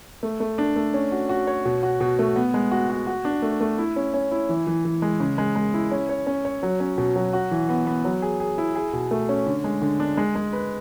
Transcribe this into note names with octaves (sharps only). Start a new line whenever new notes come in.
A3
A3
D4
A3
C#4
F#4
F#4
C#5
B2
F#4
B2
A3
B3
G#3
F#4
F#4
F#4
D4
A3
A3
E4
C#4
C#4
E4
E3
E3
E3
G#3
C#3
G#3
G#3
E4
C#4
C#5
C#4
C#5
F#3
C#4
B2
F#3
F#4
E3
B3
B3
F#3
G#4
G#4
E4
G#4
B2
A3
C#4
D3
G#3
D3
D4
G#3
G#3
B4